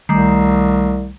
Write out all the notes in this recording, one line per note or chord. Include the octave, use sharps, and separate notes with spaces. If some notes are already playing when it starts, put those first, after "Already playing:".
C2 D#3 G3 A3 A#5 C7